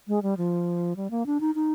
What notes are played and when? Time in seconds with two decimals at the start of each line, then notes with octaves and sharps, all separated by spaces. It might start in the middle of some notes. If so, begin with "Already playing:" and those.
0.08 G#3
0.23 G3
0.37 F3
0.96 G3
1.11 A#3
1.26 D4
1.41 D#4
1.55 D#4